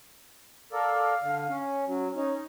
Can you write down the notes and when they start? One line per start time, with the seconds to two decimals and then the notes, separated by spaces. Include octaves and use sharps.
0.73 A4 A#4 D5 F5
1.23 D3
1.49 C#4
1.87 F#3 C#4
2.15 C#4 D#4